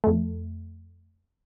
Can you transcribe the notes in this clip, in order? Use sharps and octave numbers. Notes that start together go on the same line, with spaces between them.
F2 A3